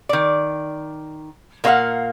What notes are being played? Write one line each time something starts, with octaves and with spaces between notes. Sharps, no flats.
D#3 D5
A#2 A#3 C#4 D4 F5 F#5